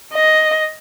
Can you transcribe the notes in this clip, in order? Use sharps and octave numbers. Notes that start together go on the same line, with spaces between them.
D#5